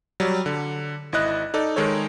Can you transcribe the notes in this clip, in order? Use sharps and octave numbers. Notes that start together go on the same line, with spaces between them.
F#3 G3
D3
G#1 E4 D#5 F#6
D#4 A4 D5
D#3 G#3 D#4 A4 C#5